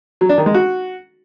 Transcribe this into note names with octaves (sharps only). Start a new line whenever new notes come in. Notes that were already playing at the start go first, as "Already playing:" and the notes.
F#3
D4
D#3
G#3
F#4